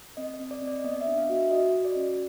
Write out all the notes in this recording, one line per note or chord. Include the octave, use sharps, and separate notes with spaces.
C4 D#5
D#5
C4
D5
C4
D5
B3 D#5
E5
D4
F5
F#4
E5
F#4 D#5
F#4
D5
C#4